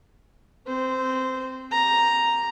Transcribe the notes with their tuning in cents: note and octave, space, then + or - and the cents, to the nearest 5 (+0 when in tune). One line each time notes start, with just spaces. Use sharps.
C4 +0 C5 -15
G4 +0 A#5 +0